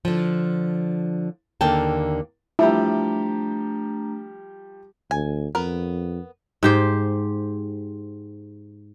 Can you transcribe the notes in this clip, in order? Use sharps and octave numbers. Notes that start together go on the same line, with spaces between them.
D3 F3
D#2 D3 A#3 G5 A5
F3 G3 A3 D4 E4 G4 A#5
D2 G#5
F2 B3 A#4
G#2 G4 C5